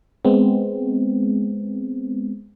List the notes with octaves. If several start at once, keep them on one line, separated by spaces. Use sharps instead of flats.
G#3 B3 C4